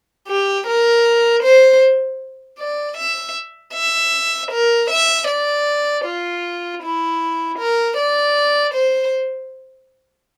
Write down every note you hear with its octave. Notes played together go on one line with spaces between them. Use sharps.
G4
A#4
C5
D5
E5
E5
A#4
E5
D5
F4
E4
A#4
D5
C5